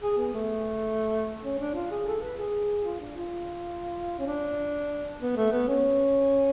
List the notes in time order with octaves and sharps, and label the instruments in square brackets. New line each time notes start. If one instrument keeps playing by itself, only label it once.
[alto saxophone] G#4
B3
A3
C#4
D4
F4
G#4
A4
B4
G#4
F4
D4
F4
C#4
D4
B3
A3
B3
C#4